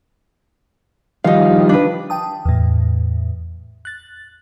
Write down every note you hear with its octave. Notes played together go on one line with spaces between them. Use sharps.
D#3 F3 G3 D#4 F5
D4 B4
G5 A5 D#6
E2 A2
F#6 A6